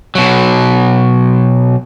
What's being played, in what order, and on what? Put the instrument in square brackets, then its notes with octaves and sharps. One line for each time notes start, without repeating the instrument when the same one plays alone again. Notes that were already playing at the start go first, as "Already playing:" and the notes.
[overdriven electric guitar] B2 F#3